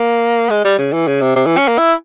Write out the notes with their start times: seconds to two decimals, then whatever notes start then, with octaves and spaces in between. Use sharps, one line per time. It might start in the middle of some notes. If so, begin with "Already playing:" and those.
Already playing: A#3
0.50 G#3
0.64 G3
0.78 C#3
0.93 E3
1.07 C#3
1.21 C3
1.36 C3
1.46 E3
1.57 C#4
1.68 A#3
1.78 E4